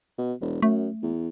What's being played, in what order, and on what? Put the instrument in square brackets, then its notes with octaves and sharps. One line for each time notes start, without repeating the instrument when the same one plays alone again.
[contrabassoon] B2
E1
[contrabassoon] F#2 [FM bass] A3
[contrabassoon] E2